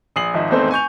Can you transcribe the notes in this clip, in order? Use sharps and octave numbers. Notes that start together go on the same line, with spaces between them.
A#1 D#6 C7 F#7
G#1 F3 D#4 E5
G#1 E2 A3 C4 D#4 C5
G#5 C#6 G6 F7